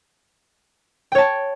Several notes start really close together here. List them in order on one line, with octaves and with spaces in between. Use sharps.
G5 C#5 A5